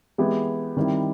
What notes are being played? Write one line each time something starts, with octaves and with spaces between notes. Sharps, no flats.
E3 G#3 B3 E4 G4
D#3 G3 C4 E4